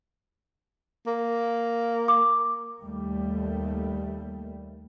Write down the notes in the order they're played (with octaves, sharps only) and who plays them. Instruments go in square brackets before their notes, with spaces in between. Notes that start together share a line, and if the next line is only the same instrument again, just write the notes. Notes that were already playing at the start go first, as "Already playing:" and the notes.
[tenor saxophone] A#3
[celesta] D6
[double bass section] D#2 G3 A3